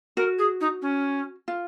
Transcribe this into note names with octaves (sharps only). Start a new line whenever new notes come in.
F#4 A#4
G#4
D#4
C#4
F4